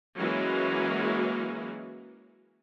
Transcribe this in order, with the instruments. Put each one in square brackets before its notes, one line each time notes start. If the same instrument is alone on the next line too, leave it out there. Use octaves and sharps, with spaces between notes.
[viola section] E3 F#3 G#3 A#3 C#4 F#4